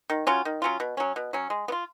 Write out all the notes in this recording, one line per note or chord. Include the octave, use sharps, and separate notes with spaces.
D#3
F#3 C#4 F4
D#3
F#3 C#4 F4
B2
F#3 C#4
B2
F#3 C#4
G#3
B3
F4